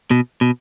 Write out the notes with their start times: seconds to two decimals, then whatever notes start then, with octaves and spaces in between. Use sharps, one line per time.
0.11 B2
0.41 B2